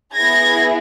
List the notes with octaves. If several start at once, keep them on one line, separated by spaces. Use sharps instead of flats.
B3 E4 G#4 G#6 A#6